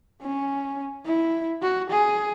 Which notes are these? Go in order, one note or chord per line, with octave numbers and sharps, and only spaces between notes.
C#4
E4
F#4
G#4